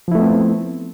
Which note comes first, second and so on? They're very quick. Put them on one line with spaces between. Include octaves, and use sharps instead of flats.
F3 E4 A3 B3 C4